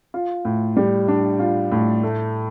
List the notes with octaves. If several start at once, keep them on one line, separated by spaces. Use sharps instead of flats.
F4
A2
G3
D4
F4
A2
A3